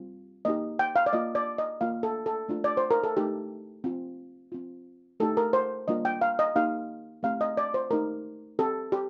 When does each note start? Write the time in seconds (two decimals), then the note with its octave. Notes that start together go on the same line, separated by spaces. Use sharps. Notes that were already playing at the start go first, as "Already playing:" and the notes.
Already playing: G3 C4 F4
0.45 A#3 D#4 G4 D#5
0.79 G5
0.96 F5
1.06 D5
1.13 A#3 F4 D#5
1.35 D5
1.58 D#5
1.81 A#3 F4 F5
2.03 A4
2.26 A4
2.49 A3 D4 F4
2.64 D5
2.77 C5
2.91 A#4
3.04 A4
3.17 A3 D#4 G4
3.84 C4 F4
4.52 C4 F4
5.20 A3 D#4 G4 A4
5.37 A#4
5.53 C5
5.88 G3 A#3 D4 F4 D#5
6.05 G5
6.21 F5
6.39 D#5
6.56 A#3 D#4 G4 F5
7.23 A3 C4 G4 F5
7.41 D#5
7.57 D5
7.74 C5
7.91 A3 D#4 G4 A#4
8.59 C4 G4 A4
8.92 G4